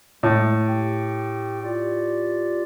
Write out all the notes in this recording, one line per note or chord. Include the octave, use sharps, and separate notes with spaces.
A2 G#3
G4 G5
F4 G4 D5